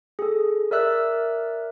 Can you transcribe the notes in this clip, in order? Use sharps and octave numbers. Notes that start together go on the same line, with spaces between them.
G#4 A4
A#4 D5 E5 E6 F#6